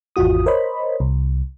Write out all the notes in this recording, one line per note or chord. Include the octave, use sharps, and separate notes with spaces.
G#1 E2 F4 F#4 D#6
A#4 C5 C#5 D#5 B5
C2